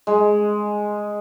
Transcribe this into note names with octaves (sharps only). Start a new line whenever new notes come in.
G#3